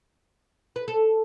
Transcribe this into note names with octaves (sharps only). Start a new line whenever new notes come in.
B4
A4